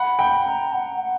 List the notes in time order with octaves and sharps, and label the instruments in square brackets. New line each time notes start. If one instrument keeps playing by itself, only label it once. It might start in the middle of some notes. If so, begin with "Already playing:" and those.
Already playing: [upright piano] F#5 [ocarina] B5
[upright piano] G5
[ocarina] A#5
F#5
F#5